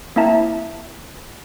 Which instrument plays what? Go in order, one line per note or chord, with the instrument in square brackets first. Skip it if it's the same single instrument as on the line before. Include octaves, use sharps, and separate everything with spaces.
[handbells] A#3 C4 E4 E5 A5 A#5